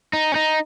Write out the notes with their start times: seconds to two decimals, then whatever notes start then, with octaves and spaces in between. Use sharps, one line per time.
0.13 D#4
0.32 C#4
0.36 D#4